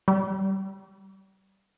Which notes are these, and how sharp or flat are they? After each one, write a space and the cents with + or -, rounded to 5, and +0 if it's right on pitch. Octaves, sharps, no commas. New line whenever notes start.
G3 -15